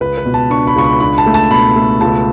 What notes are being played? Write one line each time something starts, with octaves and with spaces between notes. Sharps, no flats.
C#2 B4
B4
B2
A5
D4 C#6
B5
C#2 C#6
B5
D4 B5
A5
A3
A5
B2 B5
A3
C#2 A5